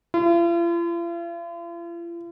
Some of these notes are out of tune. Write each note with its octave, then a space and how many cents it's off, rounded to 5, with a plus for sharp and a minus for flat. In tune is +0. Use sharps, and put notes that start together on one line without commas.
F4 -45